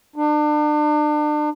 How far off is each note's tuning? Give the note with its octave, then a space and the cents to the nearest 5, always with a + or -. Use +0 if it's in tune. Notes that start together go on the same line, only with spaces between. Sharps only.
D4 +35